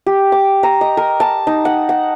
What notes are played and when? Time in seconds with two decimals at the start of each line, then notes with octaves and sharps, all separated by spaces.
0.06 G4
0.32 D6
0.63 A#5
0.81 D#5
0.97 A#4
1.20 A5
1.47 D#4
1.65 F#5
1.89 F#5